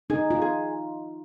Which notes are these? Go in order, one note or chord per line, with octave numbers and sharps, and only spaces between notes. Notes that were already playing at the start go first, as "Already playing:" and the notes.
D#4 G#4
F4
G#4